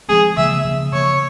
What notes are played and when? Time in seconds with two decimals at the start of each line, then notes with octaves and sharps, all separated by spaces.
0.08 F3 G#3 C4 G#4
0.37 C#3 F3 A#3 E5
0.65 C#3 F3 A#3
0.93 C#3 F3 A#3 C#5